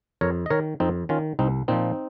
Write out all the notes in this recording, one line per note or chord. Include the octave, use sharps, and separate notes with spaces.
F2 A#4 C#5
D#5
D#3 A#4 C#5
F2 C4 D#4
D#3 C#4 F4
C2 C4 D#4
A#2 F3 C4 D#4